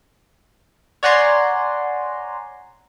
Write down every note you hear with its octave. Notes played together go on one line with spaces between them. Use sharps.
C#5 D5 F#5 G#5 A#5 C6